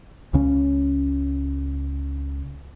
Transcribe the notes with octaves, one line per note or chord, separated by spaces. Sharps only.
C#2 C#3 C#4